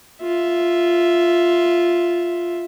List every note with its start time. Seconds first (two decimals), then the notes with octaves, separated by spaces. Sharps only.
0.23 F4 E5